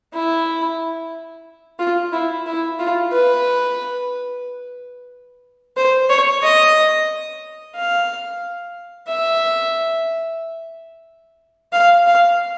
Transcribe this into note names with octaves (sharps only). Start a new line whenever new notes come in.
E4
F4
E4
E4
F4
B4
C5
C#5
D#5
F5
E5
F5
F5